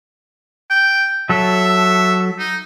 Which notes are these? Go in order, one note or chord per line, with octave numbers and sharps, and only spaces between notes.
G5
F#3 A4 E5
D#4